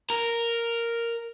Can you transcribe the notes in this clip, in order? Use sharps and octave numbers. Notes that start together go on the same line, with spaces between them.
A#4